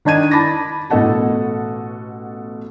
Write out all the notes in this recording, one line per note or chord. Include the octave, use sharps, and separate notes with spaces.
D#3 D4 D#5 G#6 D#7
A5 B5 D6 A6 A#6
A1 B2 A4 D#5 F#5 A5